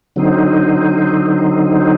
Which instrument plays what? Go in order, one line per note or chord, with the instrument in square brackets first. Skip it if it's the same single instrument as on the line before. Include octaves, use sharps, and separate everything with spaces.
[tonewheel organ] D3 F#3 C4 D#4